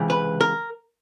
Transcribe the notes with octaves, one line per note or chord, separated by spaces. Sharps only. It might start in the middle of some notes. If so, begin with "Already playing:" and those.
Already playing: C#2 C3 E3
B4
A#4